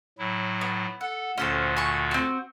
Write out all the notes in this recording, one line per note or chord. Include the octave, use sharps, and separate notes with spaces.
A2 F#3 E4
B3
A4 F#5
D2 A#2 D3 C#4 A4 C5
G#5 C#6
C4 F#4